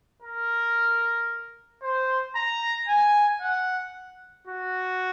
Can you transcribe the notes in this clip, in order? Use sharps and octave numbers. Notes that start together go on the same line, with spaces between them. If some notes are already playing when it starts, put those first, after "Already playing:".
A#4
C5
A#5
G#5
F#5
F#4